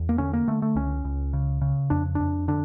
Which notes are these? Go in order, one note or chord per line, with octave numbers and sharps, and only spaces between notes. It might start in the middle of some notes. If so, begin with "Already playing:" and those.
Already playing: E2
A#3
D3 C#4
A#3
D3 A3
A3
C#2 C#4
C#2
C#3
C#3
F2 D4
F2 D4
D3 D4